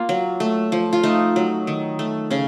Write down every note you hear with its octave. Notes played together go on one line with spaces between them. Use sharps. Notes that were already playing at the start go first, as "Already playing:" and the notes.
Already playing: A#3 F4
F#3
A3
F3
F4
A3 D#4
F#3
D#3
A3
C#3 C#4